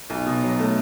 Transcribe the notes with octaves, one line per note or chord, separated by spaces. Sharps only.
B1
B2
F#3
A3